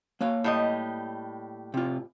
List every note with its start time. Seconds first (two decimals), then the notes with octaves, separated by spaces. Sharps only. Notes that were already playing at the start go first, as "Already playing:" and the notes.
0.21 A#3 C#5 F5
0.44 A2 G3 D#5
1.74 C3 F4